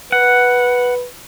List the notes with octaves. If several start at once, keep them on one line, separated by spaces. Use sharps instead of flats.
B4 F#5